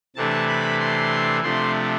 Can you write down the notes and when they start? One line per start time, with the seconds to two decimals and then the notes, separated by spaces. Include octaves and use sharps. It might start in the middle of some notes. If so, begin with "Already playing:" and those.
0.16 C3 E3 A3 D4 A5
0.47 B5
0.80 C6
1.43 C3 F3 A3 D4 C6